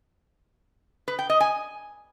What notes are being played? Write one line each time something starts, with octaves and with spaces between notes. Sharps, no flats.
B4
G5
D#5
G#5